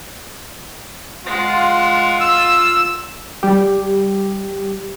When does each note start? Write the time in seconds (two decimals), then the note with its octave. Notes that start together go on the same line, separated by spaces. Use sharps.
1.26 G#3 F4 F#5
2.21 E6
3.43 G3 G4